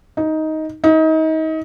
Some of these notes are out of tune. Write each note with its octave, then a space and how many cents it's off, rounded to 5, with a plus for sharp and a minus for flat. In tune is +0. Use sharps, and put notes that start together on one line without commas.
D#4 +10
D#4 +30